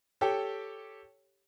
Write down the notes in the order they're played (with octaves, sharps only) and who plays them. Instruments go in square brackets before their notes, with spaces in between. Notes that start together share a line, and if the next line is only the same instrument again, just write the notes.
[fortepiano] G4 A4 C#5 G5